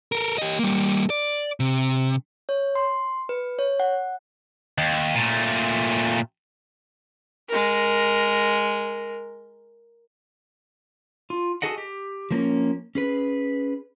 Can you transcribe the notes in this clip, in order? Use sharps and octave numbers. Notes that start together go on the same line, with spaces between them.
A4 A#4
G4 D#5
G3 A#3
D5
C3
C#5
C6
B4
C#5
F#5
D#2
A#2 A3
G#3 A#4
F4
F#4 G#4 A4 D#5 F#5
G4
F3 A#3 C4 C#4
C#4 G#4 B4